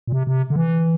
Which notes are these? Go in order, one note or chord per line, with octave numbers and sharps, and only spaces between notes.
A#2
C3
C3
D3
E3